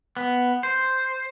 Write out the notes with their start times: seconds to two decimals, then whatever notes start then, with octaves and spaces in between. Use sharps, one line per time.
0.17 B3
0.63 C5